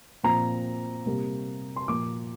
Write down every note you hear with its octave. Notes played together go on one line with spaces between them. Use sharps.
A#2 F3 C4 A#5
C3 G3 A#3
C6
A#2 F3 A#3 D6